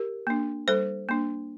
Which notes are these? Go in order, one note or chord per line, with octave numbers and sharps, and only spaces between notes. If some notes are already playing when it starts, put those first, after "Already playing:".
Already playing: G4 A#4
A#3 D4
G3 A4 C5
A#3 D4